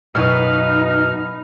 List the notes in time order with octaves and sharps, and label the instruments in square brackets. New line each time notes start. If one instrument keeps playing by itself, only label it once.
[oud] F#2 B2 [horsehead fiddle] D#4 [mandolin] B4 F5 [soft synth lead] F6